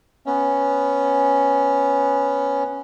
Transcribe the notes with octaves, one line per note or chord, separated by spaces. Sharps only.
B3 C#4